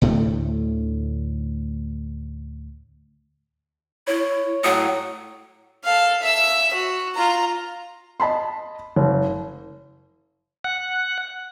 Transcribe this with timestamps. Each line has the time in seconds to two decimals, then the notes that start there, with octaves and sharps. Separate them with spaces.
0.02 D2 A2 D3 A3
4.07 E4 C#5
4.64 A2 F#3 D#5 F#5
5.84 A4 F5
6.22 E5 E6
6.74 F#4
7.15 F4 A#5
8.20 D#5 A5 B5 C6
8.96 F#1
10.64 F#5